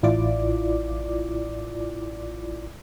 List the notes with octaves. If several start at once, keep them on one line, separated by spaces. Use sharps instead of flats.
A1 E4 F4 D5 D6